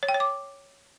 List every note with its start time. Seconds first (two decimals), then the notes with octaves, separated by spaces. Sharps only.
0.03 C#5
0.09 G5
0.14 C#5
0.20 D6